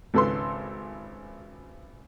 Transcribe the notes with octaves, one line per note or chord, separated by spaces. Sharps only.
G#1 C#2 A4 B4 C6